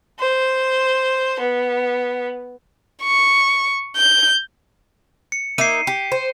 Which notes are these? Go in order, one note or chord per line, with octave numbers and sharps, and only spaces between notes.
C5
B3
C#6
G6
C#7
A#3 D#4 E5 C7 D#7
G4
C5